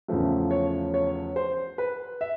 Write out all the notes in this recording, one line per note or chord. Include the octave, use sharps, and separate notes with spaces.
E2 C#3 F3 A3
C#5
C#5
C5
B4
E5